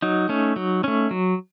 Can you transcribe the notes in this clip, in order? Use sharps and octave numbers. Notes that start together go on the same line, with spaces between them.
F#3 D#4
A3 C#4
F#3
A3 C#4
F#3